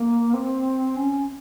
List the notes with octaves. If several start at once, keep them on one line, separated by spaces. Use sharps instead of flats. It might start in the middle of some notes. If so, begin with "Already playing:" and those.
Already playing: A#3
C4
C#4